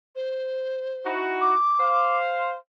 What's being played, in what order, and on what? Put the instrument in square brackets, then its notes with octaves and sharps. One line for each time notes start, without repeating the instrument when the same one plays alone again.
[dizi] C5
[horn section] D#4 E4 F#4
[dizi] D6
[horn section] C5 F5